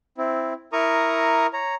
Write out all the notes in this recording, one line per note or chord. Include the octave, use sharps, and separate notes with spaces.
C4 E4
E4 A#4 A#5 C#6 D#6
C#5 A#5